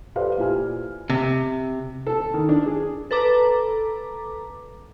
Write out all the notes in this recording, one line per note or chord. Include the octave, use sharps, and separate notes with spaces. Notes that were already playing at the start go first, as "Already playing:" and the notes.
G4 A4 B4 C5 D5 F5
A#2 E4 G4 G#5 F6
C3
A4
D#3
D4
G#4
A4 B4 A#5 D6